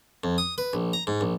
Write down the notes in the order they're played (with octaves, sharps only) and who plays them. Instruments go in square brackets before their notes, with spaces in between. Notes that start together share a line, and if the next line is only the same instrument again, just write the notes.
[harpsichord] F2
D#6
B4
A#1
A#5
G#2
A#1